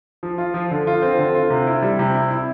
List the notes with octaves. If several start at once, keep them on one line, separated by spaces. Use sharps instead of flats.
F3
F4
F3
D3
F4
C4
D3
F4
C3
E4
G3
C3
E4
E4